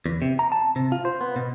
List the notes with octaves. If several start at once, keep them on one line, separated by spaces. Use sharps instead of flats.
E2
C3
A#5
A5
C3
F4
C5
B3
B2